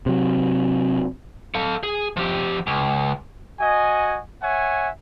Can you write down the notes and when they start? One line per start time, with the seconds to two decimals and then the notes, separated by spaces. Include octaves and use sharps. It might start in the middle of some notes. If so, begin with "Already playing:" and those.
0.06 C3 F#3
1.55 A4 F5
1.83 G#4
2.17 F3 G4
2.67 C#2
3.60 F#4 D#5 G#5
4.42 C#5 E5 F#5 G#5